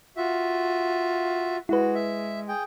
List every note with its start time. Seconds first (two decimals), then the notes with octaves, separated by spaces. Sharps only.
0.17 F4 F#4 E5
1.69 G#3 E4 F#4 B4
1.95 E5
2.48 G#4 G5